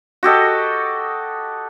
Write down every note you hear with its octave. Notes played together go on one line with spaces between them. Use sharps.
F#4 G4 A4 D#5